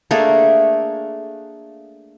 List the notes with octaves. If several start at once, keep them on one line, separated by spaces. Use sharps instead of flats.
A3 A#3 D4 G#4